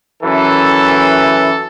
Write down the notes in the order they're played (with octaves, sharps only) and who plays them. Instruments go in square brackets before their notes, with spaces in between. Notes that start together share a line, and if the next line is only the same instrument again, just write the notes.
[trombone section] F#2 E3 [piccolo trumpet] A4